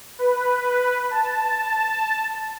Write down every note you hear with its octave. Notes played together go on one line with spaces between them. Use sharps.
B4
A5